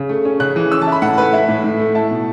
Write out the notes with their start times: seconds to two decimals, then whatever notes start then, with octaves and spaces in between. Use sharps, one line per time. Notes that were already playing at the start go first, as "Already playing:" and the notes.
Already playing: C#3
0.09 A3
0.25 C#4
0.40 C#3 F#6
0.56 E3
0.71 C#4 E6
0.82 A5
0.87 E4
0.92 B5
1.02 A2 F#5
1.18 A3 B4
1.33 E4 E5
1.48 A2
1.64 A2
1.80 A3
1.95 E4 A5
2.11 B2